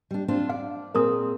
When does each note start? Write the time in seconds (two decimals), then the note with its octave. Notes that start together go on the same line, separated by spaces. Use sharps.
0.11 G3 D4
0.28 C4 D4 F4
0.49 D5 F5
0.95 A#2 C4 G#4 A#4 D#6